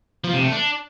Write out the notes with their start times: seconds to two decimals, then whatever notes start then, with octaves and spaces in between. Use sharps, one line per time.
0.24 F3
0.33 C3
0.43 A3
0.52 D4